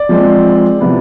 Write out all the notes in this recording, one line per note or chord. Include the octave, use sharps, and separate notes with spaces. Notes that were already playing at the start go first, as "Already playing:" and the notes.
Already playing: D5
F3 G#3 C4
C3 F3 B3 E4